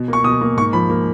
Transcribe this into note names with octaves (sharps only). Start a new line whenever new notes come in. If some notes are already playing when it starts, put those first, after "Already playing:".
Already playing: B2
A#3 C#6
B2 D#6
A#3
G#2 C#6
F3 B5
A#3